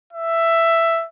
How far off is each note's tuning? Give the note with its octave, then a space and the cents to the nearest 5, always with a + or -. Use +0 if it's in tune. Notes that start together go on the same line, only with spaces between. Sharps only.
E5 +10